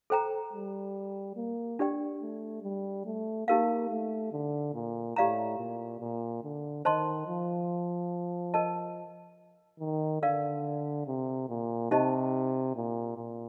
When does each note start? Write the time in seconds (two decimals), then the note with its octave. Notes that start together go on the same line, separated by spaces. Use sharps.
0.10 A4 C5 G5 A#5
0.53 G3
1.36 A#3
1.79 D4 G4 D5 G5
2.22 A3
2.63 G3
3.06 A3
3.48 A#3 D#4 G4 A#4 F5
3.90 A3
4.32 D3
4.74 A#2
5.16 A2 G4 D5 F5 A#5
5.58 A#2
6.00 A#2
6.44 D3
6.85 D#3 C5 D#5 A5 C6
7.27 F3
8.54 A#4 D#5 A5
9.80 D#3
10.22 D3 A#4 D5 F5
11.07 C3
11.49 A#2
11.91 C3 D#4 G4 C5 D#5 A5
12.76 A#2
13.17 A#2